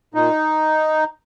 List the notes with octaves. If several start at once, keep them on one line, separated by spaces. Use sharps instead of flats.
A#2 D#4